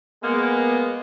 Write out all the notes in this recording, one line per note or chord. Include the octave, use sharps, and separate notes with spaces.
G#3 A#3 B3